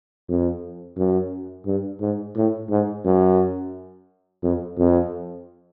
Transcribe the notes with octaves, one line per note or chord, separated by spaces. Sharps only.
F2
F#2
G2
G#2
A2
G#2
F#2
F2
F2